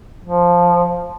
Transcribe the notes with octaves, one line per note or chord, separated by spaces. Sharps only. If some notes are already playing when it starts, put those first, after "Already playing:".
F3